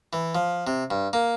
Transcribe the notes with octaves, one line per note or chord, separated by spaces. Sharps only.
E3
F3
C3
G2
A#3